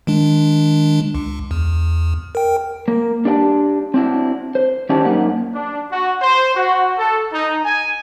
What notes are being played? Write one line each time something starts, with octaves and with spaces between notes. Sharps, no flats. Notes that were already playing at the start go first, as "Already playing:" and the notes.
D#3 G#3 D4
C#2
E2
A#4 G5
A#3
D4 G4 D5 F#5 A5
C4 D4 E4 F#4
C5
D#3 C#4 E4 G4 D5 A5
F#2 A#3 D#4 F#5
D4
F#4
C5
F#4
A4
D#4
G#5